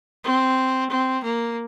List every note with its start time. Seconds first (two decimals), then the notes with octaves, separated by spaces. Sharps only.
0.24 C4
0.90 C4
1.24 A#3